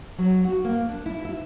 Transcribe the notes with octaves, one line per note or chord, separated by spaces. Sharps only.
F#3
F#4
A#3
D4
E4
E5